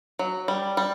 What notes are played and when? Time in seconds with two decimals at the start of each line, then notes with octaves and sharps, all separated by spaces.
0.19 F#3
0.48 G3
0.77 G3